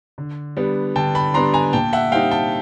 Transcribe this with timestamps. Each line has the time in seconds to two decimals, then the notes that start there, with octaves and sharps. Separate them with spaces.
0.18 D3
0.57 G3 B3 D4
0.96 D3 G5 A5
1.15 A5 B5
1.34 G3 B3 D4 A#5 C6
1.53 G#5 A#5
1.73 A#2 G5 A5
1.93 E5 F#5
2.12 G3 C4 D#4 F5 G5
2.31 G5 A5